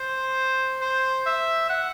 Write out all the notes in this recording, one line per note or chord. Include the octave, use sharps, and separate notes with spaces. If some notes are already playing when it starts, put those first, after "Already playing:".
Already playing: C5
C5
E5
F#5